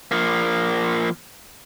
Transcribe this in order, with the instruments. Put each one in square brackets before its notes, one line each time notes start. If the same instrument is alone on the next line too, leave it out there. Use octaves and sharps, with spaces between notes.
[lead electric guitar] F3 A#3